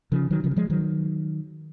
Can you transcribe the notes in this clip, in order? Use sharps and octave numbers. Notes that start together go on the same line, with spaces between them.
C#3 F3
D#3 F#3
C#3 F3
F#3
F3 G#3
D#3 F#3